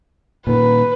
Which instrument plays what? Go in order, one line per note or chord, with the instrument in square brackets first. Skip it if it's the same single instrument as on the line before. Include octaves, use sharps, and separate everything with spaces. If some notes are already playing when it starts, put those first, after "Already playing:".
[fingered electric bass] A#2 D#3 [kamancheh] B4